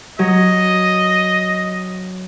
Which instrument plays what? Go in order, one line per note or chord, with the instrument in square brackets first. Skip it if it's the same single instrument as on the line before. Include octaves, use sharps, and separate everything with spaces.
[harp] F#3 [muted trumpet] D#5